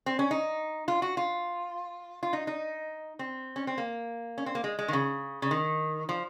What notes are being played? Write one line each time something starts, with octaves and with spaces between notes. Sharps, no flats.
C4
C#4
D#4
F4
F#4
F4
F4
D#4
D#4
C4
C#4
C4
A#3
C#4
C4
A#3
G#3
G#3
D#3
C#3
C#3
D#3
F3